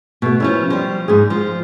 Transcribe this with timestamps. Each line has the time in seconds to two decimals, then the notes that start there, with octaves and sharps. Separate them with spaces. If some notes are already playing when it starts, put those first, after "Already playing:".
0.22 B2 A3
0.40 F3 C#4 E4
0.70 F3 G3
1.08 G#2 G#4
1.30 F3